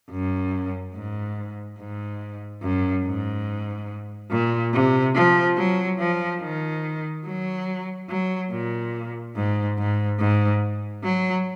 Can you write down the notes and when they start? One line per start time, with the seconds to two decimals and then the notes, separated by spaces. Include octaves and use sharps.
0.11 F#2
0.95 G#2
1.79 G#2
2.62 F#2
3.05 G#2
4.31 A#2
4.73 C3
5.15 F3
5.57 F#3
5.99 F3
6.41 D#3
7.25 F#3
8.09 F#3
8.51 A#2
9.36 G#2
9.78 G#2
10.19 G#2
11.03 F#3